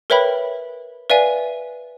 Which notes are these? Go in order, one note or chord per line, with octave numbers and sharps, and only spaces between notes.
A#4 B4 C#5 E5 G5 B5
B4 D5 E5 F5 G#5 D#7